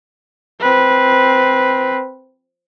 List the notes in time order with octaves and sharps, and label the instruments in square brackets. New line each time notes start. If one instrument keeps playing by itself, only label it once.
[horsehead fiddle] C4 B4